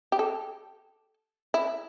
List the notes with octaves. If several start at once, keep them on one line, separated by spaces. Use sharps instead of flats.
G4
A4
E4